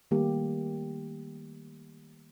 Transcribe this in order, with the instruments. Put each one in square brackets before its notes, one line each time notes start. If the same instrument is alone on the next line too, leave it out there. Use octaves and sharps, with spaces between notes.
[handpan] D#3 G3 A3 A#3 G4